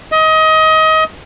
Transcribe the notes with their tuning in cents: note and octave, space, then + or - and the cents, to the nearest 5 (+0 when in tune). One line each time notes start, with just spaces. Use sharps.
D#5 +25